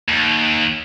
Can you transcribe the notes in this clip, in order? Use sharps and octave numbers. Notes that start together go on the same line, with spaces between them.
D#2